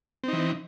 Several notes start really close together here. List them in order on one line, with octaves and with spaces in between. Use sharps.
C4 D#4 E3